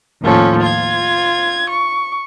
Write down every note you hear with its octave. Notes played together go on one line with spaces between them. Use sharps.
D#2 A2 F3 C#4 A4
F4 G#6
C#6